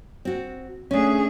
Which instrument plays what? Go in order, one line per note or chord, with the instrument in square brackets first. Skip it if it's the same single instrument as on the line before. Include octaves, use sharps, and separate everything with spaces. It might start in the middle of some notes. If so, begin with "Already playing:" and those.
[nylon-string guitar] C4 F#4
[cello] A3 G#4 [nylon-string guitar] C#4 D4